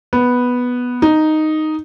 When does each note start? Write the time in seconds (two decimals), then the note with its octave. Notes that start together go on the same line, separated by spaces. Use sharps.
0.13 B3
1.02 D#4